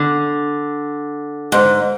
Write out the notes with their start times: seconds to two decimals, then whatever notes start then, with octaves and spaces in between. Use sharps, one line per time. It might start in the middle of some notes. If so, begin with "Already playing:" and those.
Already playing: D3
1.52 G#2